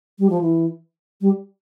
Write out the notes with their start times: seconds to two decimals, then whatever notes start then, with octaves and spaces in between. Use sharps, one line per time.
0.19 G3
0.30 F3
0.41 E3
1.21 G3